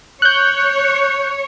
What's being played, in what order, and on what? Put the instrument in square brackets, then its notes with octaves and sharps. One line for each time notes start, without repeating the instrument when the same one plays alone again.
[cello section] C#5 [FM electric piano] F#6 G6